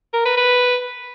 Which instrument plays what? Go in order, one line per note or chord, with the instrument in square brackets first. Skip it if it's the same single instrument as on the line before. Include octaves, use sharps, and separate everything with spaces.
[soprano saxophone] A#4
B4
B4